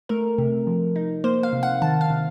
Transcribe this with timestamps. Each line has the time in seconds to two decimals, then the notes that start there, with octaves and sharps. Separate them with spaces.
0.09 A3 A#4
0.38 C3
0.67 F3
0.96 D#4
1.24 A#3 C5
1.43 F5
1.53 C3
1.63 F#5
1.82 D#3 A5
2.01 F5
2.10 C3